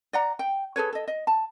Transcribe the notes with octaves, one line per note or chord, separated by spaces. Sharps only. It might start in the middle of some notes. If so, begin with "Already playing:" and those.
D5 F#5 A#5
G5
G#4 A4 B4 C#5
A4 D#5
D#5
A5